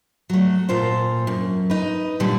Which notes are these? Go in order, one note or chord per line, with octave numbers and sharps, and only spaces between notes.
F#3 A3
A#2 F4 A4 C5
F#2
D#4 B4
A#2 D3 G3 C#4